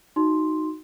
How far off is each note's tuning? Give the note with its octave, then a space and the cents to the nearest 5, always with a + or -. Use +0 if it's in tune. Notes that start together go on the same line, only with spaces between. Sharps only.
D#4 +0 F#4 +0 C6 +0